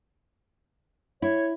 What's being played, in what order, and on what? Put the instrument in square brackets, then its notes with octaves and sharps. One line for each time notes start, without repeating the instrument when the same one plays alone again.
[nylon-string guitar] E4 [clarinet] C#5